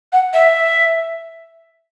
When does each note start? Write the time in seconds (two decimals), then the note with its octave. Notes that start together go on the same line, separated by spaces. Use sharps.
0.13 F#5
0.34 E5